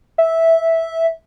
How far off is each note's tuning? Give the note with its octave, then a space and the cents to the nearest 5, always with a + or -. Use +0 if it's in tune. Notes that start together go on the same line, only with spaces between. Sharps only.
E5 -10